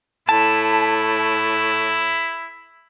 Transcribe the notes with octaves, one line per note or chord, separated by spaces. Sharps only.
A2 E4 A5